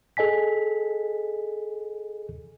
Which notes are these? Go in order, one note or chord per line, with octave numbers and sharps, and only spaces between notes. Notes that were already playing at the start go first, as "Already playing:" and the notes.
G#4 A4 D#5 G#5 B6